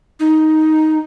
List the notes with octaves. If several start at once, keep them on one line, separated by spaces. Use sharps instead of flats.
D#4